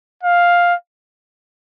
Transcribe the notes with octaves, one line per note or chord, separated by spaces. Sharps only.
F5